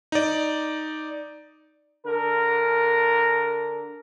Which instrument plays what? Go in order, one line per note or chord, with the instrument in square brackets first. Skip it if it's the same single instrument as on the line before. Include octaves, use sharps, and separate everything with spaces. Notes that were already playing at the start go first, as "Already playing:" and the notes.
[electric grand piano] D#4 D5
[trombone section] D3 A#4